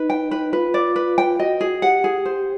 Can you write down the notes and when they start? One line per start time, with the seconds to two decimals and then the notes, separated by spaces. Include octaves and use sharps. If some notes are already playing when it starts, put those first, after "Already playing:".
Already playing: D#4 B4
0.10 G5
0.31 B4
0.52 F4 B4
0.74 D5
0.96 B4
1.18 G5
1.39 F#4 D#5
1.61 G#4
1.82 G4 F#5
2.04 G#4
2.25 C5